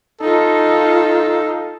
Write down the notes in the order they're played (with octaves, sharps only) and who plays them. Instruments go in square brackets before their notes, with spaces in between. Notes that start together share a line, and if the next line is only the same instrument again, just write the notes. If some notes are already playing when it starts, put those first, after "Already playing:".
[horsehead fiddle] D#4 F4 [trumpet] A4